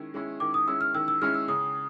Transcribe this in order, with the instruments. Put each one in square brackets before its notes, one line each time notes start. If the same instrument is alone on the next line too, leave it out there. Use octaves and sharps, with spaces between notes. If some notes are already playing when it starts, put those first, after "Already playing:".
Already playing: [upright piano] D#3 G#3 C#4 E4
G#3 C#4 E4
[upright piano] D#3 [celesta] D6
[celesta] D#6
[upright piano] G#3 C#4 E4 [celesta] E6
[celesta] F6
[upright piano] D#3 [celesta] E6
[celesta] E6
[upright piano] G#3 C#4 E4 [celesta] F6
[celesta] E6
[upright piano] C#3 [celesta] D#6